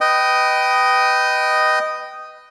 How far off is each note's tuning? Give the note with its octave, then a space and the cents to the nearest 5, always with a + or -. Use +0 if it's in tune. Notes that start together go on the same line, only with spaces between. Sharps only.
B4 +10 D#5 +0 G5 -15